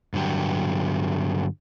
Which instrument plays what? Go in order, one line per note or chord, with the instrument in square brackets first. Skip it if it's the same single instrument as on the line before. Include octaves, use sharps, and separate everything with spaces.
[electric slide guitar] G2 D3 F#3 G4